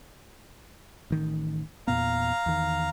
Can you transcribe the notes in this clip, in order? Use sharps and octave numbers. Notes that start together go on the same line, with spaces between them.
A1 D#3
E2 A#2 B3 F5 A#5
E2 D#3